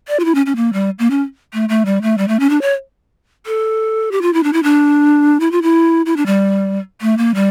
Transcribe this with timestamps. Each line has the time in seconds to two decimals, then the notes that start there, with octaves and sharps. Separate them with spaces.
0.08 D5
0.20 F4
0.25 E4
0.35 C#4
0.46 C#4
0.56 A#3
0.73 G3
0.99 A#3
1.10 C#4
1.54 A3
1.69 A3
1.85 G3
2.02 A3
2.18 G3
2.28 A3
2.40 C#4
2.50 D4
2.62 C#5
3.46 A4
4.12 G4
4.22 F4
4.34 E4
4.43 D4
4.53 E4
4.63 D4
5.40 E4
5.52 F4
5.62 E4
6.06 E4
6.17 D4
6.26 G3
7.01 A3
7.18 A#3
7.35 G3